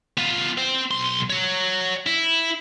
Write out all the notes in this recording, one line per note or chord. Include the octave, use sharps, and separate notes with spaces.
B3 F4
C4 C5
B1 C6
C#5 F#5
E4